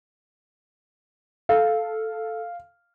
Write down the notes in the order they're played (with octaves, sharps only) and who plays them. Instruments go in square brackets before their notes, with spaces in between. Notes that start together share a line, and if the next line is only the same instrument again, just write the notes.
[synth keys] A4 [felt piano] F5